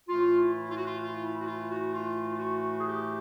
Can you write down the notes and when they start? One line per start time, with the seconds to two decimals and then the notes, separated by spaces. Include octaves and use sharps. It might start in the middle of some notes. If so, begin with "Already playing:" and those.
0.08 A2 E3 A3 F4
0.39 E4
0.69 F4
0.77 F#4
0.84 F4
1.00 F4
1.23 E4
1.40 F#4
1.46 F4
1.69 F#4
1.93 F4
2.32 F4
2.38 F#4
2.80 G#4
2.85 G4